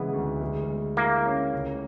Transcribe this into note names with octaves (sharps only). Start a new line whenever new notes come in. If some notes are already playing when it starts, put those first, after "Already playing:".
Already playing: C#3 E3 G#3 B3
D2
G#3
G#3
A#3 E4
C#4
C#2